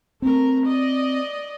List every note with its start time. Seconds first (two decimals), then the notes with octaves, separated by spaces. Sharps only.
0.22 A3 C4 A#4
0.67 D5 D#5